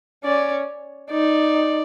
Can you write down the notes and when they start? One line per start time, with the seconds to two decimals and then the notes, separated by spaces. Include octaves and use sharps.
0.24 C#4 D5
1.11 D#4 D5